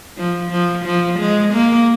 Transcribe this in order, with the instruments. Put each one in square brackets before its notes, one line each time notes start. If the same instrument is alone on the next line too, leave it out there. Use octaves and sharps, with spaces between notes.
[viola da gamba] F3
F3
F3
G#3
A#3